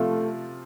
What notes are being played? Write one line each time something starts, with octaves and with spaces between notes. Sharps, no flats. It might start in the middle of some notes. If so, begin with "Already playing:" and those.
Already playing: C3 F3 A3 C4 F4